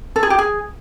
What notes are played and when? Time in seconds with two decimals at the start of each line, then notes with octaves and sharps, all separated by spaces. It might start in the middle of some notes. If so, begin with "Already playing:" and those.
0.16 A4
0.23 G#4
0.30 G4
0.39 G#4